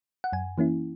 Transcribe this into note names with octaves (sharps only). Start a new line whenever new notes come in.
F#5
F#2 G#5
E3 A#3 C#4 E4